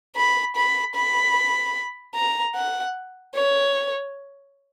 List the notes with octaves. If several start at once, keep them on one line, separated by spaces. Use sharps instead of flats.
B5
B5
B5
A#5
F#5
C#5